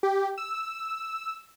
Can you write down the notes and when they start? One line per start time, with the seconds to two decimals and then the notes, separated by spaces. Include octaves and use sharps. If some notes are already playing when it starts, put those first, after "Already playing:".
0.03 G4
0.38 E6